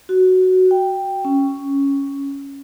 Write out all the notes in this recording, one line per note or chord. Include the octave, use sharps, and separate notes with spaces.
F#4
G5
C#4